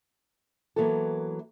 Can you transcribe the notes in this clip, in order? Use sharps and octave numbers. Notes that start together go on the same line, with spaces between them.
E3 F#3 A#3 B3 A4